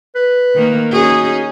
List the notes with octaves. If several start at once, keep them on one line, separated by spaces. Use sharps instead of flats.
B4
D#3 A#3
C#4 D#4 F#4 G#4